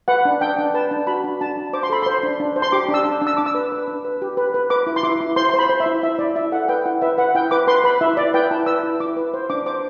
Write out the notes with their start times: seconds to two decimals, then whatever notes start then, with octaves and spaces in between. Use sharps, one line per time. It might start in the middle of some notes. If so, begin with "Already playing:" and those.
0.08 B4 F#5
0.25 D4
0.41 D4 G5
0.58 D4
0.74 B4 A5
0.91 D4
1.07 F#4 B5
1.24 D4
1.41 D4 A5
1.57 D4
1.73 C5 D6
1.83 C6
1.90 A4 B5
2.02 C5 C6
2.23 D4
2.40 D4
2.56 C5
2.62 C6
2.72 G4 D6
2.89 D4
2.94 E6
3.05 D4
3.22 D4
3.27 E6
3.37 D4 D6
3.46 E6
3.54 B4
3.72 B4
3.88 D4
4.05 B4
4.22 G4
4.37 B4
4.54 B4
4.70 B4 D6
4.87 E4
4.96 C6
5.03 E4 D6
5.21 E4
5.36 C5 C6
5.49 C5 C6
5.59 B5
5.69 C5
5.80 E5
5.86 E4
6.03 E4 E5
6.19 E4 D5
6.36 E4 E5
6.52 A4 F#5
6.68 B4 G5
6.85 E4 F#5
7.02 B4 E5
7.18 B4 F#5
7.35 E4 G5
7.51 B4 D6
7.67 B4 C6
7.84 B4 B5
8.01 E4 E5
8.17 E4 D5
8.34 B4 G5
8.51 E4 A5
8.66 B4 E6
8.83 E4
9.00 E4 D6
9.17 B4
9.34 C5
9.50 D4 D6
9.66 C5 D6